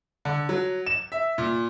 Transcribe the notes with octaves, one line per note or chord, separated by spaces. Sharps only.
D3
F#3
E7
E5
A#2